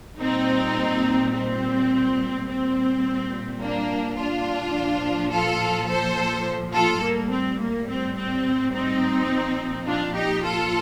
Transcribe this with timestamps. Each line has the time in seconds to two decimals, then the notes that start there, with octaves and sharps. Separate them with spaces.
0.19 A#2 G3 C4 D#4
1.33 C4
2.47 A#2 G3 C4
3.60 A#3 D4
4.17 D4 F4
4.75 A#2 F3
5.32 F4 A4
5.88 A4 C5
6.73 F4 A4
7.02 A2 G3 A#3
7.31 C4
7.60 A#3
7.88 C4
8.16 C4
8.73 C4 D#4
9.29 A#2 F3
9.86 D4 F4
10.15 D#4 G4
10.44 F4 A4